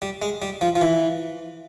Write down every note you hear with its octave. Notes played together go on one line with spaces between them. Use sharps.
G3
G#3
G3
F3
F3
E3